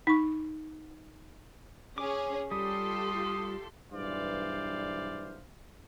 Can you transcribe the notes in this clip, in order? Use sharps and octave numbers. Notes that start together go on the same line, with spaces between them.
D#4 C#6
C#4 G#4 D6
G3 F4 G4 A4 C6 D#6
B1 G2 E3 C5 D5 F5